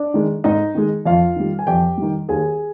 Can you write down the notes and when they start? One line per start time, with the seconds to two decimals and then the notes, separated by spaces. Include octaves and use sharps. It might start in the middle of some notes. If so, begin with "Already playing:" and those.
Already playing: D4 D5
0.14 D#3 G#3
0.44 G#2 D#4 D#5
0.75 D#3 G#3
1.05 F2 F4 F5
1.36 D#3 G3
1.59 G#5
1.67 F2 G4 G5
1.98 D#3 G3
2.29 D#2 G#4 G#5